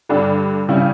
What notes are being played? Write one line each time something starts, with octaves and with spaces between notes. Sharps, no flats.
G2 D3 G3 D4
C#3 G3 C#4 E4